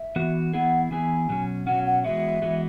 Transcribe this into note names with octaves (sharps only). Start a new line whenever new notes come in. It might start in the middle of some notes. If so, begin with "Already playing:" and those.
Already playing: E5
E3 B3 F#4
E3 B3 E4 G#4 F#5
E3 B3 E4 G#4 G#5
B2 F#3 C#4
B2 F#3 C#4 F#5
F#5
E3 G#3 B3 F#4 E5
E3 G#3 B3 F#4